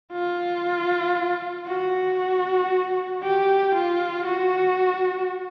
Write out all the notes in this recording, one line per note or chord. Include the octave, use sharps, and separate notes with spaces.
F4
F#4
G4
F4
F#4